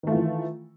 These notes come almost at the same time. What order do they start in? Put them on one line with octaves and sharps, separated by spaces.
D#3 A3 F4 E3